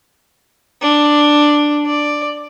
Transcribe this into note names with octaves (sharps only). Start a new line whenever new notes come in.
D4
D5